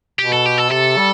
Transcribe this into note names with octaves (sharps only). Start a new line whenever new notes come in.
B2 G4
A4
G4
A4
C3 A4
G3